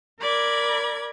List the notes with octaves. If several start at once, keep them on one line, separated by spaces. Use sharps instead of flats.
A#4 D5 B5 G#6